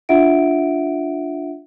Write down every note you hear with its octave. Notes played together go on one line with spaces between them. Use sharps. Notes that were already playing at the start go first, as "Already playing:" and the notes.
D4 F4 E5 F#5 D7